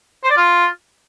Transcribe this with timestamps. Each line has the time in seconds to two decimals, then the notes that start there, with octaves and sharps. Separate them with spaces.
0.24 C5
0.30 D5
0.37 F4